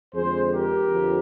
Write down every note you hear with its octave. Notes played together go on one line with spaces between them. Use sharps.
F2 D3 G#3 G#4 C5
G4 A#4
F2 D3 F3